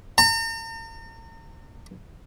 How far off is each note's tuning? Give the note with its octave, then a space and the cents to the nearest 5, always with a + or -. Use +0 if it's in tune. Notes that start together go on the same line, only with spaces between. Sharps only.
A#5 -45